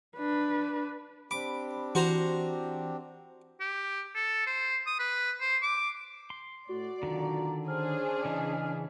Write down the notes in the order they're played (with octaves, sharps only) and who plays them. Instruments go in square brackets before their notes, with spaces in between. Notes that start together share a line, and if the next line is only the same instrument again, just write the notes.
[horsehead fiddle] D4 B4
[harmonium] C4 D4 G4 [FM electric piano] B5 [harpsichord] D6
[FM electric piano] E3 [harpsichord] F#4 C5 A#5
[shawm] G4
A4
C5
D#6
B4
C5
D6
[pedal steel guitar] C6
[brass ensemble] A2 [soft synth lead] F#4 [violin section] D5
[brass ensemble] B1 F4 A#5 [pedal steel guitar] D3 D#3
[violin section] C#4 D4 G#4 [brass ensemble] C5 [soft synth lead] F6
[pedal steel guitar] C#3 E3 [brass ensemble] D#5 G#5